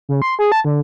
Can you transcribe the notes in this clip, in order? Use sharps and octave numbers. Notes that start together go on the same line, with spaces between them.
C#3
C6
G#4
A5
D3